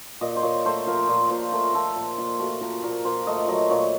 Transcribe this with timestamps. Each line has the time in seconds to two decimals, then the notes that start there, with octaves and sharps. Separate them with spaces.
0.21 A#2 D#5
0.36 C5
0.43 A#2 C#5
0.65 A3 C5
0.87 F3 A#4
1.09 A#2
1.30 A#2 C5
1.52 A3 A#4
1.74 F3 A4
1.96 A#2
2.18 A#2 F4
2.39 A3 F#4
2.61 F3 A#4
2.83 A#2 A#4
3.05 A#2 C5
3.27 A3 D#5
3.48 F#3 D#5
3.70 A#2 C#5